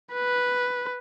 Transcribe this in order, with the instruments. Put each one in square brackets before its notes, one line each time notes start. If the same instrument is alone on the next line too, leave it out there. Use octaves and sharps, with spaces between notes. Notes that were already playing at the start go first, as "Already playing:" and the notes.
[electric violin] B4